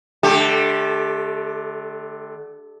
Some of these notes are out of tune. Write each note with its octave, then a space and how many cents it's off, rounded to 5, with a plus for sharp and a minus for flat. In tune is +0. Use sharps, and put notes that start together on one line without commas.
D3 +10 A3 -30 G4 +10